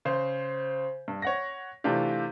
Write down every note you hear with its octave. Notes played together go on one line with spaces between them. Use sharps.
C#3 C5
G2
C#5 F#5 A#6
C3 E3 A3 D4 F4 G4